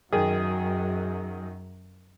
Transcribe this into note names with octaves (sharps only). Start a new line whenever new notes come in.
F#2 D#3 F#3 G#4